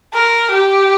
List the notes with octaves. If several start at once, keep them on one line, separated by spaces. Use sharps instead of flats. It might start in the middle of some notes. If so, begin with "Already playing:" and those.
A#4
G4